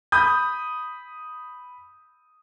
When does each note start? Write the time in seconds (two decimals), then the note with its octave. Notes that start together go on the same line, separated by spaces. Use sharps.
0.12 B5 D#6 G6